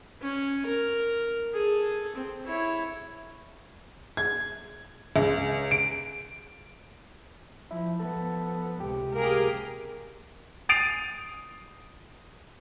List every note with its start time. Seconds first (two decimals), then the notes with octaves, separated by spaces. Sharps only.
0.22 C#4
0.65 A#4
1.54 G#4 A4
2.16 C4
2.46 E4 C#5
4.17 G#6
5.16 C#2
5.71 D7
7.71 F3 E4
8.00 F3 B3 A4
8.80 C#2 C3 G4
9.15 A#3 G4 G#4 A#4
10.69 D#6 A6 C7 D7 D#7 F7